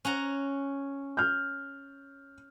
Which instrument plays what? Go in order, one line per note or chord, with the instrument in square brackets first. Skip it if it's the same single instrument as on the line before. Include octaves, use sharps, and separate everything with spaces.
[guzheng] C#4 F#5 A#5
[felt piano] F6 G6